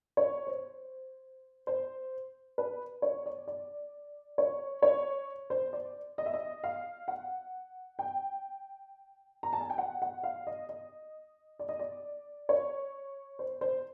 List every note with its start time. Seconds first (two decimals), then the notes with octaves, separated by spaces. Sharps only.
0.17 C#5
0.47 C5
1.67 C5
2.58 B4
3.02 C#5
3.26 D5
3.47 D5
4.38 C#5
4.82 C#5
5.50 C5
5.73 D5
6.18 D#5
6.26 E5
6.34 D#5
6.64 F5
7.08 F#5
7.99 G5
9.43 A#5
9.53 A5
9.61 G#5
9.70 G5
9.78 F#5
10.02 F#5
10.23 F5
10.47 D#5
10.69 D#5
11.59 D5
11.69 D#5
11.79 D5
12.49 C#5
13.39 C5
13.61 C5